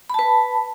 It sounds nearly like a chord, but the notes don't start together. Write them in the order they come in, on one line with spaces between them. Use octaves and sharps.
B5 A5 B4